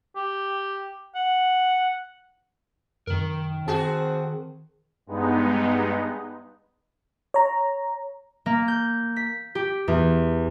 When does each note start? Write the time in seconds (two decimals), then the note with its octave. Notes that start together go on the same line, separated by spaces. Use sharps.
0.16 G4
1.15 F#5
3.07 F#2 C3 D#3 A#4
3.68 C4 F#4 G#4 A5
5.07 G2 G#3 B3 D#4
7.34 C#5 A#5
8.46 A#3
8.68 G6
9.16 B6
9.55 G4
9.88 E2